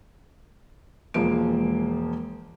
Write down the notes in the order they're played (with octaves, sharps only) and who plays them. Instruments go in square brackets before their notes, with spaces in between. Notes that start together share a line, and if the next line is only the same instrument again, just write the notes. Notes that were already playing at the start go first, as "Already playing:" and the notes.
[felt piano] E1 F3 G#3 A#3 D7